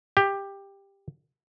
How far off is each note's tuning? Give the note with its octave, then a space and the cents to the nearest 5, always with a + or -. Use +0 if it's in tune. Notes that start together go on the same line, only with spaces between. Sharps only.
G4 +10